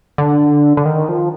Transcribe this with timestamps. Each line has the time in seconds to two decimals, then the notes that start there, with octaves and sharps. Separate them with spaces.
0.18 D3
0.77 D3
0.86 D#3
1.09 F3